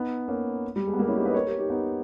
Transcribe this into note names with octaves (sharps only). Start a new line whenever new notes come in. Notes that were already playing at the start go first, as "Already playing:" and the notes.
Already playing: B3 D#4
A#3 C#4
G3
G#3
B3
G3 A#3
C#4 E4
D#4 G4
B4 D#5
A#4 C#5
G4 A#4
D#4 G4
B3 D#4